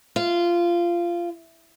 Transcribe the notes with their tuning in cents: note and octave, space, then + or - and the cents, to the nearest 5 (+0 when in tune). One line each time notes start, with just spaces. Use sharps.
F4 -15